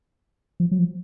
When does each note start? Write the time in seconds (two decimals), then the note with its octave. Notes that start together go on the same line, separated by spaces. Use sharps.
0.60 F3
0.71 F#3
0.79 F3